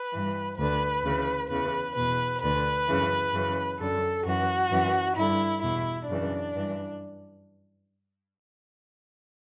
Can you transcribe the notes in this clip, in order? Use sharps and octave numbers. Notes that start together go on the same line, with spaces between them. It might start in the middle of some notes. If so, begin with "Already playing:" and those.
Already playing: B4
G2 E3
D2 D3 B4
D2 C#3 E3
E2 C#3 E3 B4
E2 B2 B4
D2 D3 B4
F#2 C#3 E3
F#2 C#3 E3
F#2 D3 A4
F#2 E3 F#4
F#2 E3
G2 D3 E4
E2 B2 E4
F#2 C#3 E3 D4
G2 E3